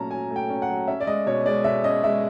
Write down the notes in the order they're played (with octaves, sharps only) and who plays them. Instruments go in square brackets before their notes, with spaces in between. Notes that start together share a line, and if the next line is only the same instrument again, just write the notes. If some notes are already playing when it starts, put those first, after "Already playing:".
Already playing: [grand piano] A#2 F#3 A3 C#4 A5 A#5
F#3 G#5
A3
G5
C#4
F#5
F#3
C#4 E5
D5
G#3 D#5
B2 C#5
G#3 D5
B2 E5
C#4 D#5
G#3 E5